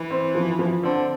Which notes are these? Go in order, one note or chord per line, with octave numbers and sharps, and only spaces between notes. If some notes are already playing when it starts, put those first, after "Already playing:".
Already playing: E3
C4
F3
F3
D3 C4